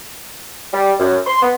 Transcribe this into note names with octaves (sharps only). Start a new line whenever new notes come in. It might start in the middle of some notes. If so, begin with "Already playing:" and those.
G3
F#2
C6
B3